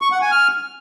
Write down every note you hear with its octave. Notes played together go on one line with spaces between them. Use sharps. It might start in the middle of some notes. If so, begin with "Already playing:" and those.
C#6
F#5
G#5
F6